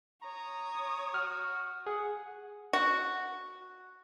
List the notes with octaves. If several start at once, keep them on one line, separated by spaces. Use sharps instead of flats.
C#5 A#5 D#6
F#4 F6
G#4 F#5
F#4